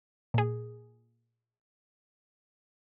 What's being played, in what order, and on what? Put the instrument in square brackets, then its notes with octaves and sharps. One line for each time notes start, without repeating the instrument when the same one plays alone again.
[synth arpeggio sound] A#2 G#4